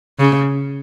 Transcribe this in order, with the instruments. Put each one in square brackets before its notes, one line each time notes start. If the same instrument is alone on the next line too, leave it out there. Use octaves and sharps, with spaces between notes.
[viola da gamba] C#3